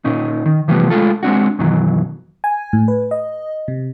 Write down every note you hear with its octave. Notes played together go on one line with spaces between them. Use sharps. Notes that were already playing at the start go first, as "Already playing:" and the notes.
A#2 C#4 D#4
D#3
C3 E3 F3 G3 A3 B3
G#3 A3 F4 A4
G#3 C4 D4 F#4
F#2 B2 D#3 E3 F#3
G#5
A2
B4
D#5
C3